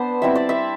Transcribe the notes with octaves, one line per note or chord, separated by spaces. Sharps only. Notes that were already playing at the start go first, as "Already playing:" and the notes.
Already playing: B3 D4 C5
G3 C4 E4 E5
D5
E5